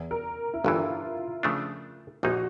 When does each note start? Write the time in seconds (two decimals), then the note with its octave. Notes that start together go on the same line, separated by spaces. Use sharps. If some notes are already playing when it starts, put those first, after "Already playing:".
Already playing: E2
0.11 A#4
0.54 E4
0.64 G1 G2 E3 F4
1.43 C#3 F3 A3 D4
2.23 A#1 A#2 F3 A#3 D#4 F#4